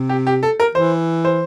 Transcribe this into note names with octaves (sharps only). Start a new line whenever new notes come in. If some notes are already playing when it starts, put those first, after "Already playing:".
Already playing: C3
G4
G4
A4
A#4
E3 C5
C5